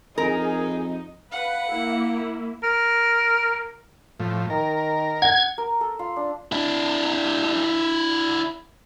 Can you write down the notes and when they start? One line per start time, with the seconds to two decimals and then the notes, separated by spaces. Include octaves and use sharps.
0.18 F2 D#4 G#4 A#4
1.32 B4 F5 F#5
1.72 A#3 E4
2.63 A#4
4.20 A2 F3
4.50 D#3 A#4
5.22 F#5 G#6
5.58 A#4
5.81 A4
5.99 F4
6.16 D4
6.52 D4 E4